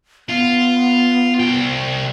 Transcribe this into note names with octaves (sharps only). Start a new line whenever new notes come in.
B3 F4
C2 G5